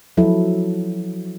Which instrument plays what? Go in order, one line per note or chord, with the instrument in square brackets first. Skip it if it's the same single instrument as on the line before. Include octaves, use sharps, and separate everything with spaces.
[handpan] F3 F#3 E4 A4